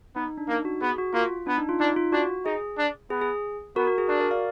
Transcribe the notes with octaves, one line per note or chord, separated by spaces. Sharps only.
B3 D#4
D4
A#3 D#4
F#4
B3 G#4
F#4
A#3 F4
B3 D4
D#4
F4
D4 D#4
F4
D4 F#4
D#4 G#4
D4
B3 G#4
G#4
B3 F#4 A#4
F#4
G#4
D4 F#4 A#4
A#4 D5
D5 F5